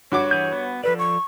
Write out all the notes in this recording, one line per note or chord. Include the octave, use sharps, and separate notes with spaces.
G2 F#4 C#5 D6
E3 G#4 G6
B3
F3 A4 B4 D5
C#6